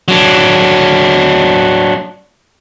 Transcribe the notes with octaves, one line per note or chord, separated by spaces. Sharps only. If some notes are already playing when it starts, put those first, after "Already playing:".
F#3 D4